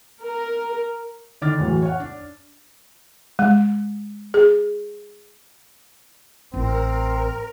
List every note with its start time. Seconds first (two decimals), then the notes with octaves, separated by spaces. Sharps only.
0.24 A#4
1.41 D3 D#3 D4 D6 F6 A6
1.58 E2 A2 E3 F#3
1.82 C#5 F#5
2.00 D4
3.39 G#3
4.34 G#4
6.54 A1 C4 E4 A#4